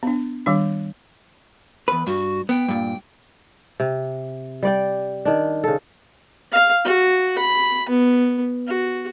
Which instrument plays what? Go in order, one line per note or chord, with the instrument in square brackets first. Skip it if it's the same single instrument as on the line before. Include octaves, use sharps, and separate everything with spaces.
[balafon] B3 D4
D#3 G3 D4
[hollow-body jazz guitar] E2 B4
[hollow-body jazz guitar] G2 [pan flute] F#4
[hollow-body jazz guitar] B3 [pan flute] G5
[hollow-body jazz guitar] G2 A#2
[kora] C3
G3 D5 G5
D#3 D4
C#3 A4
[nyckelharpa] F5
F#4
B5
B3
F#4